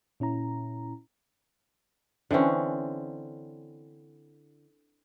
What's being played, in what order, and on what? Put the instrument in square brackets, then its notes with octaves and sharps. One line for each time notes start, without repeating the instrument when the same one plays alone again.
[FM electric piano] A#2 C#4 E4 A#5
[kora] D3 E3 C4 C#4